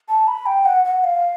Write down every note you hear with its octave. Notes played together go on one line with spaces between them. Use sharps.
A5
B5
G5
F#5
F#5
F5